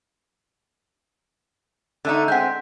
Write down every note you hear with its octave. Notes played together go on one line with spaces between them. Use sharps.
D3 A3 D#4
G#3 C4 F#5 G6